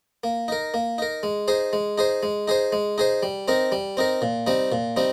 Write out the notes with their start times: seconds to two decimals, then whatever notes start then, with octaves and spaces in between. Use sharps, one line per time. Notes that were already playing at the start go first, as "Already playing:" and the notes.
0.24 A#3
0.48 D#4 A#4
0.74 A#3
0.98 D#4 A#4
1.23 G#3
1.48 D#4 G#4 C5
1.73 G#3
1.98 D#4 G#4 C5
2.23 G#3
2.48 D#4 G#4 C5
2.72 G#3
2.98 D#4 G#4 C5
3.23 G3
3.48 C4 D#4 A#4
3.72 G3
3.97 C4 D#4 A#4
4.22 A#2
4.47 G3 C4 D#4
4.72 A#2
4.96 G3 C4 D#4